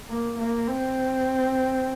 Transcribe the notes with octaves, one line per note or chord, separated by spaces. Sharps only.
A#3
A#3
C4